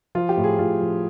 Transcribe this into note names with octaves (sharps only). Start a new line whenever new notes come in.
F3 F4
G4
A2
G#4
A2 F4
F3